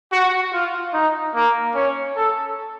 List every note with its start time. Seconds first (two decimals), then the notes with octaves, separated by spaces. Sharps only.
0.12 F#4
0.53 F4
0.93 D#4
1.35 A#3
1.75 C#4
2.16 A4